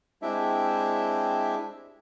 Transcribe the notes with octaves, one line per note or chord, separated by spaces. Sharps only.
G#3 C4 D4 E4 G4 E5